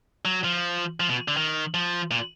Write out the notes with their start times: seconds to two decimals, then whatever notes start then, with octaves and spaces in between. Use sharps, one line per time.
0.25 F#3
0.44 F3
1.00 F3
1.09 B2
1.28 D3
1.37 D#3
1.74 F3
2.11 A#2